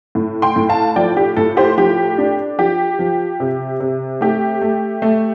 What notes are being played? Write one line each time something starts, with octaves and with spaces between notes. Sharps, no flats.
A2
G5 C6
A2
F5 A5
F3 D5 G5
G4
A2 A4
G4 C5
F3 G4
D4
F3 G4
F3
C3
C3
A3 G4
A3
A3